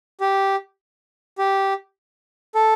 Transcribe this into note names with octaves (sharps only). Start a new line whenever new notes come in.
G4
G4
A4